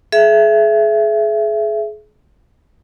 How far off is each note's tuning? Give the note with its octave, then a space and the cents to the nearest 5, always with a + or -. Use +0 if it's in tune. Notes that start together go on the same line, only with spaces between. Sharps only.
G#4 +35 E5 +20